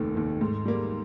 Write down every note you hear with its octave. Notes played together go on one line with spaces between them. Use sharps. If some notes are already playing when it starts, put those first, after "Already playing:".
Already playing: F1 D#2 D#3
D#2 D#3
G#2
G3 A#3